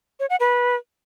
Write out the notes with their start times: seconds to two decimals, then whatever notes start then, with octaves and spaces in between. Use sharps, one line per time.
0.20 C#5
0.30 F#5
0.40 B4